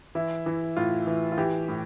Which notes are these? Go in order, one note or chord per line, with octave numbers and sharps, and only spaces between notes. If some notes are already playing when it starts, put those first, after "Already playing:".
E3 E4
E3
A2 F4
E3
F4
E3 G4
A2